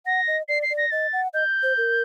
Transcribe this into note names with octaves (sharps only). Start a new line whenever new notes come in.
F#5 A#6
D#5
D5 C7
C7
D5
A#6
D#5 A6
F#5
D#5 G6
C5
A#4